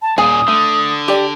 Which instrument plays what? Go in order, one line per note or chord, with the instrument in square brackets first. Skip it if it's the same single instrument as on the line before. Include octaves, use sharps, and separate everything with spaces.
[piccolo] A5
[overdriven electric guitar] D#2 A#2 [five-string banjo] G#4 G#5 [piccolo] D#6
[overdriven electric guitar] D3 [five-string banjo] A3
[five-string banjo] G4 D5